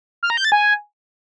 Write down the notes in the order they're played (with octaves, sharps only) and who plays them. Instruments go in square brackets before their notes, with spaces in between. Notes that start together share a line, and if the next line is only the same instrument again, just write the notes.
[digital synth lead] F6
A#5
G6
A6
G#5